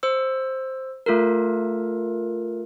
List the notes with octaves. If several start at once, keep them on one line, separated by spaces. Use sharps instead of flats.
C5 E6
A3 F4 A4 A#4